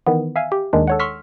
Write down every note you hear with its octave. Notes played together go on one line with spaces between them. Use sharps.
D#3 E3 B3
E5 F5 G#5
G4
D#2 D#3 G#3 D4
A4 C#5 F#5
C6 C#6 E6 F6 B6